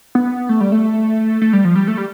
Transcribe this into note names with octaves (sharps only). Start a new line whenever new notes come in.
B3
A3
G3
A3
A3
G3
F3
G3
A3
G3